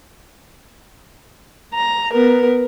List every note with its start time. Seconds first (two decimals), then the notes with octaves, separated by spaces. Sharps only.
1.74 A#5
2.13 B3 A#4